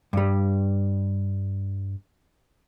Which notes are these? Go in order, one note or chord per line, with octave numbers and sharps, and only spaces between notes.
G2 G3